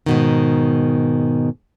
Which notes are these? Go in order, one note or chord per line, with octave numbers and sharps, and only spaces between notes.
G#2 B2 D#3